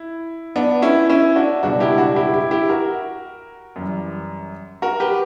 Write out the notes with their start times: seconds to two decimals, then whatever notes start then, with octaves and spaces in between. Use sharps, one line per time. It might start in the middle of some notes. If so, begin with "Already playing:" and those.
Already playing: E4
0.56 B3 D4
0.82 C#4 E4
1.09 C#4 E4
1.36 D4 F#4
1.63 C#2 B2 G3 D4 F#4
1.80 E4 G4
1.98 D4 F#4
2.16 E4 G4
2.33 E4 G4
2.51 E4 G4
2.69 F#4 A#4
3.76 F#2 E3 G3
4.82 F#4 A#4
5.00 G4 B4